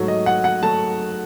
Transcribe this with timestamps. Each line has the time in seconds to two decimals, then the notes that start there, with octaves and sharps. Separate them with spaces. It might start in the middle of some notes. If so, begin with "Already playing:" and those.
Already playing: G#2 F#3 A3
0.08 D#5
0.26 F#5
0.44 F#5
0.63 F#3 A3 A5